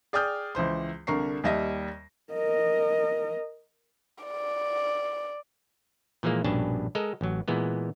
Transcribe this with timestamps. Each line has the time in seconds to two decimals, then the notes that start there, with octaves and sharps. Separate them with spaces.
0.13 G#4 D5 G5 D#6 F6 G6
0.55 C#2 E3 C5 C6
1.07 C2 D3 A#4 C#6 C7
1.44 D#2 G3 D#5 E5 A#6
2.33 A#4 D#5
4.24 D5
6.23 A#2 E3 F3 G#3 A#3
6.44 A#1 G2 B2 C#4 D4 A5
6.95 G#3 A4 A#4 D#5
7.21 A1 F#3
7.48 A#2 E3 G#3 B3